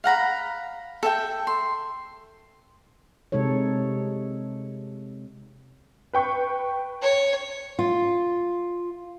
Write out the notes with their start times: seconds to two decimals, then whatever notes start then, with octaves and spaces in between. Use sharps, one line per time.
0.04 F5 F#5 A#5 B5
1.03 A4 E5 G5
1.47 C6
3.32 C3 G#3 D#4 A4 C#5
6.13 B4 G5 C#6
7.02 C#5
7.79 F4